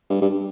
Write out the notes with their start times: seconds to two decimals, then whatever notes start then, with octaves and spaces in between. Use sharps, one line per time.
0.10 G2
0.22 G2